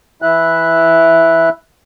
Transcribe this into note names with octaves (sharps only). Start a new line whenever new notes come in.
E3 E4 E5 F#6